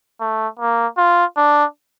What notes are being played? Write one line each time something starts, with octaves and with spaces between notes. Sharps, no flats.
A3
A#3
F4
D4